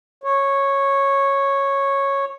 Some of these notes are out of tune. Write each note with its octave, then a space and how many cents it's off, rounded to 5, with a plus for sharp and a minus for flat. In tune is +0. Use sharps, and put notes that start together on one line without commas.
C#5 -10